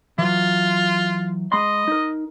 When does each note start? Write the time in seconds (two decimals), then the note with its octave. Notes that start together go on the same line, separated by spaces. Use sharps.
0.18 E3 F#3 F4
1.52 G#3 D#5 B5 C6
1.88 D#4 A#4